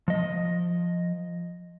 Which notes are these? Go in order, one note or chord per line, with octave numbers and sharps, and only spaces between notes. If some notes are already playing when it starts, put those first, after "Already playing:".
F3 D#5